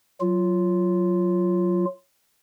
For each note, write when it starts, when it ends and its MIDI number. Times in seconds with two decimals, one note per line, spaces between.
0.21 1.85 54
0.21 1.85 65